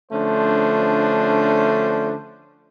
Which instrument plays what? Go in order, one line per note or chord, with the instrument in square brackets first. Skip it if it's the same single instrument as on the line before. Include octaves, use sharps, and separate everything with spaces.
[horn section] D3 F3 A3 C#4 D4 C5